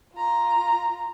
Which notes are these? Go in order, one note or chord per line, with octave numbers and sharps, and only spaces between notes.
F4 A#5